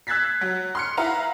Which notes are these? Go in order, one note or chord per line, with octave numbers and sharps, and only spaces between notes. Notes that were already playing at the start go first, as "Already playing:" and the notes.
E6 F#6 G#6 A6 B6 C7
F#3
C6 F6 C#7
E4 B4 F5 F#5 A#5